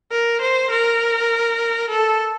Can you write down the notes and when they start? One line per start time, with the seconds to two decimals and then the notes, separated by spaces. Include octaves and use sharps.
0.11 A#4
0.41 C5
0.71 A#4
1.90 A4